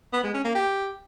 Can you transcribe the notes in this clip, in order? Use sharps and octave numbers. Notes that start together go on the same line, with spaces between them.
B3
G#3
C#4
A#3
G4